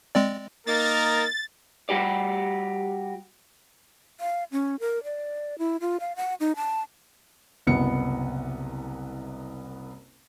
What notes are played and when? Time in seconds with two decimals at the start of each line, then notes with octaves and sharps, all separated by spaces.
0.15 G#3 C4 D5
0.66 A#3 D#4 A#4 A6
1.89 G3 F#4 G4 D5
4.20 F5
4.52 C#4
4.80 A#4
5.04 D5
5.58 E4
5.81 F4
6.00 F5
6.16 F#5
6.40 D#4
6.56 A5
7.67 F#1 C2 B3 C#7